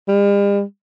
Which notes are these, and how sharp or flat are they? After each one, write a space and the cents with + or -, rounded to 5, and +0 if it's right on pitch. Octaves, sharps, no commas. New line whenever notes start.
G3 +45